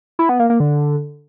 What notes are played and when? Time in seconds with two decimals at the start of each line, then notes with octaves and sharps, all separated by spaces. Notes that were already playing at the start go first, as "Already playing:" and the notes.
0.19 E4
0.29 B3
0.39 A#3
0.50 A#3
0.60 D3